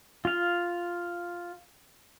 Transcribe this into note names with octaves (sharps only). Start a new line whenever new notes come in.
F4 F5